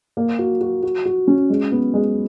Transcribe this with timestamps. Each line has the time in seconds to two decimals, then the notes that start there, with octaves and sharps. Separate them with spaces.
0.17 A#3
0.39 F#4
0.61 F#4
0.83 F#4
1.05 F#4
1.28 C#4
1.50 G#3
1.72 B3
1.94 G#3